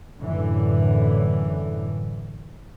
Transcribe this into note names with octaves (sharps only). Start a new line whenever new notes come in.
F#2 A2 D3 E3